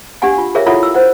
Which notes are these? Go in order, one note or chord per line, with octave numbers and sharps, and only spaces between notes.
D4 G4 F5 F#5 G#5
F4
G#4 A#4 C#5 E5 F5
E4 F4 A4 C#5 E5 F#5
E6
C5 F#5